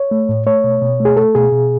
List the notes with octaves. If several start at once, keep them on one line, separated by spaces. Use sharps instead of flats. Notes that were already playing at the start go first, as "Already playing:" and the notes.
Already playing: C#5
A3
A2
A3 C#5
B2
B2
A3
G#4
A3 A4
B2 G#4
B2